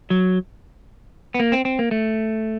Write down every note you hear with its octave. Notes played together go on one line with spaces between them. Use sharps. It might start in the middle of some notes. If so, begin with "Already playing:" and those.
F#3
B3
A#3
C4
C4
A#3
A3